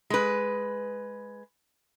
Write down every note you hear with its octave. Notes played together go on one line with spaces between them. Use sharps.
G#3 B4